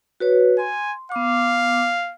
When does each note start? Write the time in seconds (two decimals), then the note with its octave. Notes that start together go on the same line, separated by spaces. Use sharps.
0.20 F#4 B4 C#5
0.59 G#5 C6
1.12 B3 F5 D6